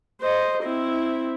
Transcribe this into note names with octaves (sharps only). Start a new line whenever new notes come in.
C5 D#5
C4 E4